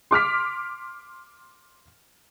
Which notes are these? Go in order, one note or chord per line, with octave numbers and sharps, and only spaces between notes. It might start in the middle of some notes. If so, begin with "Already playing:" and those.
C6 D6 F6 B6